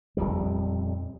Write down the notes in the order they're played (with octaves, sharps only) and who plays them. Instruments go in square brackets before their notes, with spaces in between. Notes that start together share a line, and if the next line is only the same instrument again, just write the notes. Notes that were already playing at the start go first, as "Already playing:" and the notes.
[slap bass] D#1 B1 F2 G3